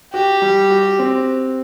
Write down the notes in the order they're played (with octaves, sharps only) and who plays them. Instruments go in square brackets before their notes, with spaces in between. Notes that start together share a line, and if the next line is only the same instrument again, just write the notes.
[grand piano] F#4 [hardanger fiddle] G4
[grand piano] G3
F#4
C4